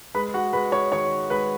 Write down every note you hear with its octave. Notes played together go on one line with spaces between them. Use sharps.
G#3 B4 B5
F#4 F#5
G#3 B4 B5
C#5 C#6
D#3 C#5 C#6
G#3 B4 B5